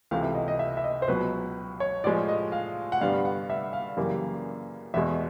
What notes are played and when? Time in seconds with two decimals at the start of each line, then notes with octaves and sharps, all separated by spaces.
0.11 C#2 C3 E3 A3 F5
0.23 E5
0.35 D#5
0.48 D#5
0.59 E5
0.77 E5
0.84 D#5
1.02 C5
1.08 C#2 B2 F#3 B4
1.80 C#5
2.04 A2 F3 G#3 D5
2.28 D#5
2.52 F5
2.92 F#5
3.01 G2 D3 G3 B3 F5
3.25 F#5
3.50 E5
3.73 F5
3.97 F#2 C#3 E3 G3 A#3
4.94 E2 B2 G#3 E5